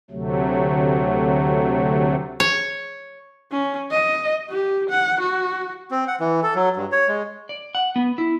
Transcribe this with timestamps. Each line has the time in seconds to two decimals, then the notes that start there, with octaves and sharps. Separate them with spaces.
0.11 D2 C3 F#3 A3
2.40 C#5
3.52 C#4
3.91 D#5
4.50 G4
4.89 F#5
5.20 F#4
5.91 C4
6.08 F#5
6.20 E3
6.43 A4
6.55 F#3
6.76 G2
6.92 C#5
7.08 G#3
7.49 D5
7.75 F#5
7.96 B3
8.18 E4